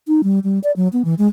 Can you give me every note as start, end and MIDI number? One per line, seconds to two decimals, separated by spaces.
0.08 0.21 63
0.24 0.39 55
0.44 0.59 55
0.64 0.71 74
0.76 0.88 54
0.93 1.02 59
1.05 1.14 52
1.18 1.27 56